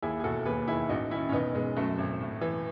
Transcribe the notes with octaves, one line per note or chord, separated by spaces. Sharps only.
D#2 E4 G#4
G#4
E1 F#4 A4
D#2 G#4 B4
D#3 E4 G#4
A1 D#4 F#4
D#3 C#4 E4
C#4
E1 B3 D#4
E1 G#3 B3
F#2 F#3 A3
G#1
A2
E3